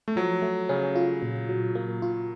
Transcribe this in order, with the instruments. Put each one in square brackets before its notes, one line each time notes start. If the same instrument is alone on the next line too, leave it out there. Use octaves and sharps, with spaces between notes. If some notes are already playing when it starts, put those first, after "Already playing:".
[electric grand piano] A3
[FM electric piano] F3 [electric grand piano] F#3
[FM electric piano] A3
[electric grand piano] C#3 [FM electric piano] C#4
[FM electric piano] F4
A#2
F#3
A#3
F4